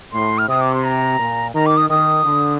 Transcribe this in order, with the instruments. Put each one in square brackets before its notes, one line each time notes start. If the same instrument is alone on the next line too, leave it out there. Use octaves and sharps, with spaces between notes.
[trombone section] A2 [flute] C6
[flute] F6
[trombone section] C3 [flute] D#6
[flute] D6
C6
A#5
[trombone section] A#2
[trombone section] D#3 [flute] A#5
[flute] D6
D#6
[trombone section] D#3 [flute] D#6
[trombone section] D3